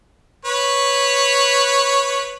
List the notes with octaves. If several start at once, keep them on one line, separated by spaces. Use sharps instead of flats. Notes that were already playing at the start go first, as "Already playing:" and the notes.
B4 C#5